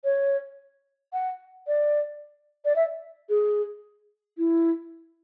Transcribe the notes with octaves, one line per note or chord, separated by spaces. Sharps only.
C#5
F#5
D5
D5
E5
G#4
E4